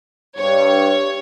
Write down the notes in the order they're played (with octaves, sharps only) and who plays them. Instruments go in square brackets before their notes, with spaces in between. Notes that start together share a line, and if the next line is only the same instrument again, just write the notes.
[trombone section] G2 [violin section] C#5